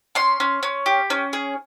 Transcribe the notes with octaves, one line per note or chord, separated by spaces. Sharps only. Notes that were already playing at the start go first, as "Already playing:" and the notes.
C#4 C6
C#4
C#4
G4
C#4
G#4